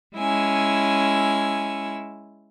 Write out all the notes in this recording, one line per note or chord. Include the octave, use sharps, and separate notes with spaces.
G#3 C#4 E4 G#5 E6